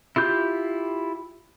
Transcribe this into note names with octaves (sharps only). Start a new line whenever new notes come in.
E4 F4 G4 G6